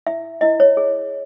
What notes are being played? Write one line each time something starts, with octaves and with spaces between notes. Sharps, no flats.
E4 E5
E4 D#5
C#5
G#4